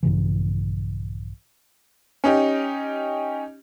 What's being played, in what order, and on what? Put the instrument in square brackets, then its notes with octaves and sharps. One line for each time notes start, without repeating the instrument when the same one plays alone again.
[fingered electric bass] A#1 G2 C#3 E3
[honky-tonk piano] C#4 D#4 G4